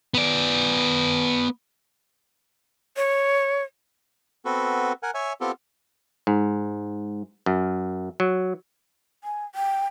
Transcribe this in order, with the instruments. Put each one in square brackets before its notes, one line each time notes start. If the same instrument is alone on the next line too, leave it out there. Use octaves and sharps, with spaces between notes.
[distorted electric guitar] B3 D5
[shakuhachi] C#5
[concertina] B3 C4 F#4 A4 B4
A#4 F#5 G#5
C#5 E5 G#5
B3 C4 F4 G4 A4
[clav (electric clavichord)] G#2
F#2
F#3
[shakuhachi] G#5
G5